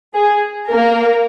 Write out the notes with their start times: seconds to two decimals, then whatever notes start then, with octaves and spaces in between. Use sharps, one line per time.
0.15 G#4
0.70 A#3 A#4